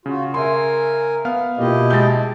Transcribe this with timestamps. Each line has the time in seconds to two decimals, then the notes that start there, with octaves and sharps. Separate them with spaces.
0.06 C#3 F4 F#4
0.34 A#4 E5 G#5 C6
1.25 B3 F5 F6
1.58 B2 A#3 E4 F4 G4 D#5
1.90 G#3 A5 G6 A6